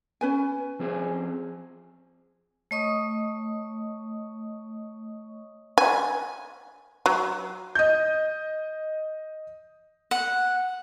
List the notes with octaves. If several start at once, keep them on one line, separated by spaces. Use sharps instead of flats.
C#4 B4 G#5
F3 C4 G#4
A3 C#5 D#5 C#6 D#6
G#5
F#3
D#5 G6
F#5